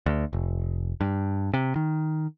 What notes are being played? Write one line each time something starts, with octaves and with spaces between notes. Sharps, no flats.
D2
F1
G2
C3
D#3